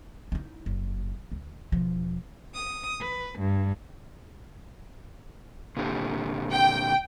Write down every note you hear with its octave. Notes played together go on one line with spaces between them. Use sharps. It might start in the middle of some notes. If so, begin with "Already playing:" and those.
D#4 E4
F#1
D2
E1 F3
D#6
B4
G2
A#2 D3 G4
G5